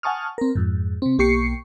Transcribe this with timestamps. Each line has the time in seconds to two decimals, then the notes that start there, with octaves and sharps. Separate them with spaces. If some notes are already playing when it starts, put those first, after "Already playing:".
0.03 F#5 G#5 A5 C#6 D#6 F6
0.38 C4 A#4
0.55 F2 G#2
1.02 C3 C4
1.18 B1 A#3 G4 C#6 C7 C#7